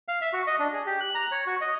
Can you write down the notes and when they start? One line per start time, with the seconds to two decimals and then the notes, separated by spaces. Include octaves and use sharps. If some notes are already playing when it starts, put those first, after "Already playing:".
0.08 F5
0.21 E5
0.33 F#4
0.47 D#5
0.59 D4
0.73 G#4
0.86 G4
1.01 F#6
1.15 A#5
1.32 C#5
1.47 F#4
1.61 D#5